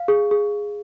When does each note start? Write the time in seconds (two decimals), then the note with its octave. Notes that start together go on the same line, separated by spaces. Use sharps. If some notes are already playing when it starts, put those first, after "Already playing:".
Already playing: F5
0.08 G#4
0.31 G#4